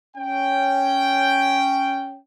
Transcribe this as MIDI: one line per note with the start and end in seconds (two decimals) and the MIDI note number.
0.17 2.17 61
0.17 2.17 79